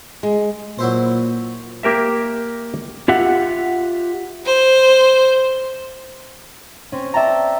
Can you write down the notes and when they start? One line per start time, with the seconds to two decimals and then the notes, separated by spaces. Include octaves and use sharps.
0.23 G#3
0.79 A#2 F#3 E4 C5
1.83 A#3 G4 A#4 E5
3.08 F4 G4 E5 F#5
4.46 C5
6.92 C4 C#4
7.14 D5 E5 G5 A5 A#5